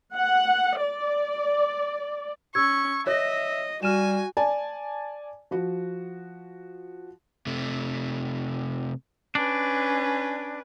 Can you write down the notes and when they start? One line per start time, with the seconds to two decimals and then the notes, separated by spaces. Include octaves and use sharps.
0.15 F#5
0.82 D5
2.55 C#4 C#6 E6 G#6
3.07 C#5 D#5 E5 A#6
3.83 G3 F#4 G#5 F6 D#7 E7
4.37 D5 G#5 A5
5.51 F3 F#4
7.47 C3 A3
9.35 C#4 D4 B4